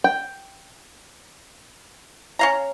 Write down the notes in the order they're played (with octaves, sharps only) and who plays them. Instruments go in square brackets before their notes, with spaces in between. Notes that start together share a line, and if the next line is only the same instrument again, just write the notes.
[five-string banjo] G5
[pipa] C#4 F5 A#5